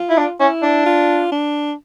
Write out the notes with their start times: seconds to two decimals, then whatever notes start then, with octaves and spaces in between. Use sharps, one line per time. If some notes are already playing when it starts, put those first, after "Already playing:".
Already playing: F4
0.09 E4
0.17 D4
0.40 C#4 E4
0.62 D4
0.86 F4
1.32 D4